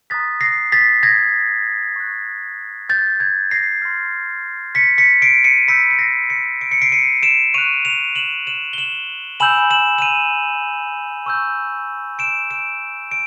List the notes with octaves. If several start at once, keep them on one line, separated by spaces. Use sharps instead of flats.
A#5 D#6 F#6 A6 B6
A#6 C7
A6 B6
G#6 A#6
C#6 F#6
G6 A6
G#6
A#6 C7
C6 F6
B6 C#7
B6 C#7
C7 D7
C#7 D#7
B5 E6 G6 B6 C#7
C#7
A#6 C7
B6 C#7
D7
C#7
C7 D7
C#7 D#7
D7 E7
C#6 F#6 D#7 F7
D#7 F7
E7 F#7
E7 F#7
G7
E7 F#7
G#5 B5 E6 G6 E7 F#7
E7 F#7
E7
D#7 F7
C#6 E6 G6
D7 E7
D7 E7
D7